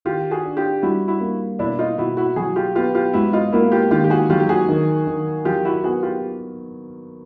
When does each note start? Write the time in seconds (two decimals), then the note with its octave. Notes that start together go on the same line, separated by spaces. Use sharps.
0.05 D#3 F4 G4
0.31 F#4 G#4
0.44 D4
0.57 F4 G4
0.83 G3 E4 F#4
1.08 E4 F#4
1.21 A#3
1.59 B2 D4 E4
1.79 D#4 F4
1.98 B2 E4 F#4
2.17 E4 F#4
2.36 F#3 F#4 G#4
2.56 F4 G4
2.75 B3 F4 G4
2.94 F4 G4
3.13 G#2 E4 F#4
3.33 D#4 F4
3.53 A#3 E4 F#4
3.72 F4 G4
3.91 D#3 F4 G4
4.04 G4
4.10 F#4 G#4
4.29 F#3 F4 G4
4.40 G4
4.49 F#4 G#4
4.69 D#3
5.07 D#3
5.45 F#3 F4 G4
5.65 E4 F#4
5.84 B3 F#4 G#4
6.03 F4 G4